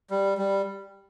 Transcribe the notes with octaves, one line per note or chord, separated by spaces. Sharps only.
G3
G3